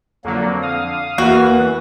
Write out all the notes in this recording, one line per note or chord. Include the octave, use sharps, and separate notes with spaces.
F2 D3 F#3 A#3
F5 D#6
E2 E3 A#3 F#4 F#5